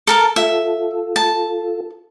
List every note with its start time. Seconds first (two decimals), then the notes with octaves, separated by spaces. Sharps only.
0.07 A4 A#4 A5
0.36 F4 A4 E5
1.16 A5